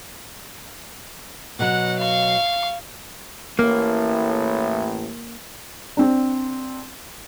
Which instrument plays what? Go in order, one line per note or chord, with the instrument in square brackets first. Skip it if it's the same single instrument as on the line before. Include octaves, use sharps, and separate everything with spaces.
[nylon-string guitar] B2 F#3 [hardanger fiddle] F#5
[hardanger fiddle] F5 C#6
[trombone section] A1 A2 [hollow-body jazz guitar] A#3
[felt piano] C4 D4